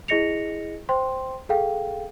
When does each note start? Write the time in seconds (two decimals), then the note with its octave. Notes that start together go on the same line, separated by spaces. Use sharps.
0.08 E4 G#4 D#5 A#6 C#7 F7
0.89 C5 G5 C6
1.49 G#4 A4 F5 G5